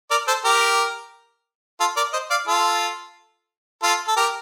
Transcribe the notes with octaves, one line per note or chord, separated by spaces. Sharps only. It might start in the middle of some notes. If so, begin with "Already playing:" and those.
A#4 D5
A4 C5
G4 A#4
F4 A4
A#4 D5
C5 D#5
D5 F5
F4 A4
F4 A4
A4
G4 A#4